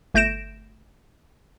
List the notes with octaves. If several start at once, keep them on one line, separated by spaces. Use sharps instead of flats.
G1 A3 G6 A#6 D7 E7